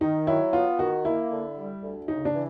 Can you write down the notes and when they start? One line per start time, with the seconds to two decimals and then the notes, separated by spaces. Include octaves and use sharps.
0.01 D#3 D#4
0.27 F#3 E4
0.53 B3 F4
0.79 D#3 F#4
1.05 A#3 E4
1.30 D3
1.57 G3
1.83 D2
2.08 C#3 D#4
2.25 D4
2.34 E3